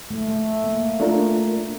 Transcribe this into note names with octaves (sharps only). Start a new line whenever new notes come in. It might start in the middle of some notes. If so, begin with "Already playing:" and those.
A3
A3
A#3
A3 D4 F4 A#4